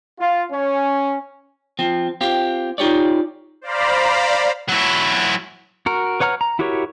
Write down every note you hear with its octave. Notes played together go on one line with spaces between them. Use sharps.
F4
C#4
F3 C4
C4 F4 G4
D#4 F4 G4 C#5 D5
C5 D5 F5 A#5 B5
F#3 E4
F#4 A#4
B4 C#5 F#5 A#5 F6
A#5
E4 F#4 G4 A#4 C#5